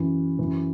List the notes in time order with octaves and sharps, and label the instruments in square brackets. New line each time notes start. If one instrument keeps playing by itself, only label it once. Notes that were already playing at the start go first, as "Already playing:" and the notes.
Already playing: [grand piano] F#2 E3
F#2 E3